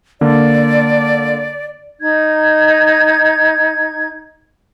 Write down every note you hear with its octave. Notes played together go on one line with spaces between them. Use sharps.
D3 A#3 D5
D#4 G#6